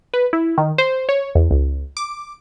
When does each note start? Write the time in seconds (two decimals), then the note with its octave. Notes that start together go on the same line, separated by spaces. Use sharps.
0.14 B4
0.33 E4
0.58 D#3
0.78 C5
1.09 C#5
1.35 E2
1.51 C#2
1.97 D6